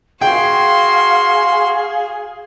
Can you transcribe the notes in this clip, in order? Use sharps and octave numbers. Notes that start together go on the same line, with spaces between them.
F#4 G#4 F5 G5 C6